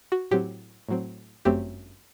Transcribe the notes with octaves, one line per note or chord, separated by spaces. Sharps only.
F#4
A2 F#3 C4 G4
A2 F#3 C4
G1 F#2 F#3 A3 C4 G4